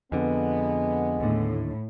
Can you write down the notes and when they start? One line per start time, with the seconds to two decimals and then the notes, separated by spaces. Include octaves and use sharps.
0.12 F2 D3 G#3 B3
1.20 D#2 A2 D3